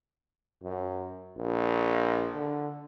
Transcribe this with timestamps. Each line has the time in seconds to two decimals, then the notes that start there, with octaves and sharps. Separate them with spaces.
0.63 F#2
1.36 A#1
2.34 D3